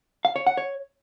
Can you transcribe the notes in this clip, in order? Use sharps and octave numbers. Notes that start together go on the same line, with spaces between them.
F5
C#5
F#5
C#5